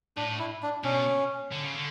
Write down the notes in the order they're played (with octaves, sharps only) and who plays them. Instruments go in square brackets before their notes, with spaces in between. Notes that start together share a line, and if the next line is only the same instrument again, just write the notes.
[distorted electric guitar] A2 [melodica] D4
[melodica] E4
D4
[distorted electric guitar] B2 [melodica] C#4
[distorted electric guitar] D3
C#3
D3